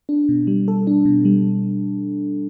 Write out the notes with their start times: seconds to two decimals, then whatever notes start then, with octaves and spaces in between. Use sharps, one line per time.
0.09 D4
0.29 B2
0.47 G3
0.68 A4
0.87 D4
1.05 B2
1.25 G3